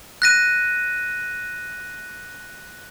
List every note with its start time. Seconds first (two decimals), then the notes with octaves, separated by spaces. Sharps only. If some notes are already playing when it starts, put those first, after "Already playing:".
0.22 F#6 A#6 D#7